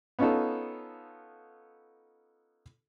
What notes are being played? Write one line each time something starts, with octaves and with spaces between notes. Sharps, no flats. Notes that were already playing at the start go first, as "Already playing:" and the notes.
B3 C#4 D#4 F4 A4